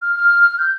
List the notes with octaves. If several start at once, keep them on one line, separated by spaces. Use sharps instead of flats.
F6
F6
F6
G6